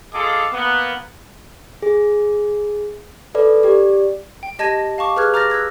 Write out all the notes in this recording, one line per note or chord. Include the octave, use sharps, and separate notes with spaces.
F4 G#4 A4 D#5 F5 D6
A#3 B3
G#4
A4 B4 D5
G4 D5
G5
G4 D#5 A5 G#6 A#6 D#7
F5 A5 C#6 D6
G#4 B4 D6 F6 F#6 G#6
A#5 D6 F6 G6 A6 A#6
E6 F#6 G#6 A#6